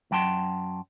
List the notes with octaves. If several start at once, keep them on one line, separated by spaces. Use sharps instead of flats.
F#2 F#3 G5 A5 C6